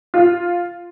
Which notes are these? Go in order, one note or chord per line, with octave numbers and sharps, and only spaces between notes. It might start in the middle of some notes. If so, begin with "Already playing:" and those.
F4